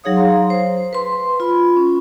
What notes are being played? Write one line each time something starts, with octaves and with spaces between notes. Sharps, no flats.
F#3 D#4 G#4 C#5 F5 D#6
F5 A#5 C6
C5
B4 C6
F4 B5
C#4